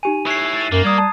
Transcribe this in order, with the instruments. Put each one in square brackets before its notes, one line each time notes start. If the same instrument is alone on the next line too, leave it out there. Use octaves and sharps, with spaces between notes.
[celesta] D#4 G4 G#5 [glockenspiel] D#7 F7
[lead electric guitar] E4 C#5 [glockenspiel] F#6 C7
[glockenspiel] A6 D#7
[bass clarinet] F#2 [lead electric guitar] A#3
[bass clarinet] G3 [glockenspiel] A#5 D#6 G#6
[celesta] A5